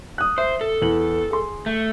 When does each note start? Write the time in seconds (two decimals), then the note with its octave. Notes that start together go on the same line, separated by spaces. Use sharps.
0.18 D#6 F#6
0.38 C5 E5
0.61 A4
0.82 E2 F#7
1.31 G#4 C6
1.66 A3